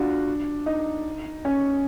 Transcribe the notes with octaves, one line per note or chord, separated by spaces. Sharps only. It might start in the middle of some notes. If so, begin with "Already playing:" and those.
Already playing: D4 F4 F#4
D#4
C#4